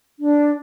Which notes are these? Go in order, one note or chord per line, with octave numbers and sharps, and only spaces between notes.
D4